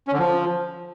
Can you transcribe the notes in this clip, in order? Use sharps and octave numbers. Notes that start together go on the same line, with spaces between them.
C#4
D3
F3